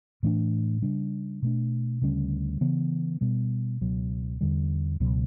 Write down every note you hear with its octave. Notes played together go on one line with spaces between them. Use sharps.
A2 E3 A3 D4
C#3 G3 D4
B2 A3 D4
D2 C#3 G3 C#4
C#3 E3 B3
B2 G3 B3
C#2 B2 F#3
E2 D3 G3
C#2 B2 F#3